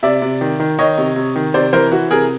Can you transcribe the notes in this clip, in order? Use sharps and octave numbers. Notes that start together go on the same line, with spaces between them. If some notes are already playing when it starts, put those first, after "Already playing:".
C3 D5 E5
C3
D#3
D#3
D#3 C#5 D#5
C3
C3
D#3
C3 C5 D5
E3 A#4 C5
E3 F#4
C3 G#4 A#4